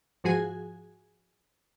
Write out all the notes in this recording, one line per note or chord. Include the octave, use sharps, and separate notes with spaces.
G#2 F3 F#4 G#4 G#5